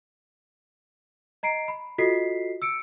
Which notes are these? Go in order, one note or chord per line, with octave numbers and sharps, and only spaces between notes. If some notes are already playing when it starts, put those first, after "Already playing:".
D#5 A#5 C7 D7
B5
F4 F#4 A4 D#5 B6 C7
E6 C#7 D7